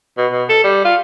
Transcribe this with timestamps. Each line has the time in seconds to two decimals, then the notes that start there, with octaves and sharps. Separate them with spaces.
0.18 B2
0.32 B2
0.49 A4
0.64 G3
0.85 F4